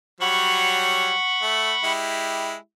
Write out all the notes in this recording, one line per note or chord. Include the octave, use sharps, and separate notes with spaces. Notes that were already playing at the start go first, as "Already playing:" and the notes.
F#3 G3 C#5 F#5 B5 C#6
A3
G#3 E4 G4